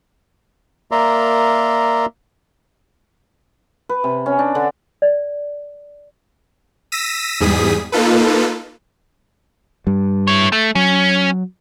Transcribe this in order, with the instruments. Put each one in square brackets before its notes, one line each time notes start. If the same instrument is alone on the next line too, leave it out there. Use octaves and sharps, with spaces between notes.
[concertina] A#3 A#4 D5 E5 A#5 C6
[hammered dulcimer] B4
C3
C#4
D4
D3
[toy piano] D5
[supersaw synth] E6 A#6 B6 D#7
E2 G#2 G3 G#4 D#6 B6
A#3 D#4 F4 A4 B4
[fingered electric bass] G2 G3
[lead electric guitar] E4 C#5
A3
[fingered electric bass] F#3 [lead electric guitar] C#4